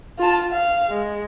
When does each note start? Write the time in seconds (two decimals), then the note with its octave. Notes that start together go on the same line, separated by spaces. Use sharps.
0.19 F4 A5
0.51 F5
0.90 G#3